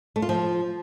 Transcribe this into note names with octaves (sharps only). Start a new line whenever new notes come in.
A3
F4
F3